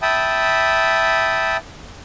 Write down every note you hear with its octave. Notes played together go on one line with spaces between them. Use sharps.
E5 G5 A5 B5 D#6